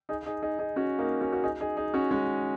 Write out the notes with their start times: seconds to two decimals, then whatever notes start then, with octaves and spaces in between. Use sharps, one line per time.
0.09 D#4 G#4
0.26 D#4 G#4
0.43 D#4 G#4
0.59 D#4 G#4
0.76 C#4 F#4
0.99 A#3 D#4
1.21 C#4 F#4
1.32 F#4
1.44 D#4 G#4
1.61 D#4 G#4
1.77 D#4 G#4
1.94 C#4 F#4
2.11 G#3 C#4